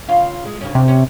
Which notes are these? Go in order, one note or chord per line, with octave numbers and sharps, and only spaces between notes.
C#3 F4 F5
G#3
D2 C#3 C#4
C3
C#4